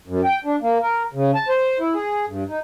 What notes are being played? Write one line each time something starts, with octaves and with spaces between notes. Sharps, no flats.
F#2
G5
D4
A#3
A#4
C#3
A5
C5
E4
G#4
G2
D#4